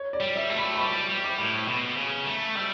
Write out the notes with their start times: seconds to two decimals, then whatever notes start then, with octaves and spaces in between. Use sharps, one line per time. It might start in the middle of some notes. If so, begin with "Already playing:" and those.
Already playing: C#5
0.13 D5
0.20 G3
0.36 E5
0.50 A3
0.58 B5
0.75 B5
0.79 G3 C#6
1.09 G3
1.24 D6
1.38 A2
1.68 B2
1.97 C#3
2.26 A3
2.55 G3 E6